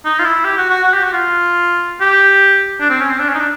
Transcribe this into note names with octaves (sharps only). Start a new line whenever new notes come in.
D#4
F4
E4
G4
F#4
F#4
F#4
G4
F#4
F4
G4
D4
C4
C#4
C4
D4
C#4
D#4
D4